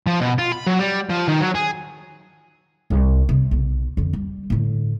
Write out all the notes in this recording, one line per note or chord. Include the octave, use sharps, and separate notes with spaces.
F3
B2
F4
B5
F#3
G3
F3
D#3
F#3
G#4
C2
C3
B1
F2 D3
G3
A2 D3